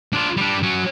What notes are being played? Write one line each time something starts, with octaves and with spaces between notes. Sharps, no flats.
D4 F4
G3 D4
F#3 C#4